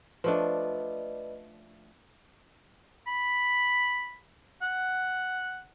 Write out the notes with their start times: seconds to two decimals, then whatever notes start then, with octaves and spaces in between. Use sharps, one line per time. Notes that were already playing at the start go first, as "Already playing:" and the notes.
0.24 F3 A3 D4 B4 D5 D#5
3.07 B5
4.62 F#5